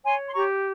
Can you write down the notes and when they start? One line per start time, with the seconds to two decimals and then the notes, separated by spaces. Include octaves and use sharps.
0.04 C#5 G#5 C6
0.28 C6
0.34 G4 A#5 C#6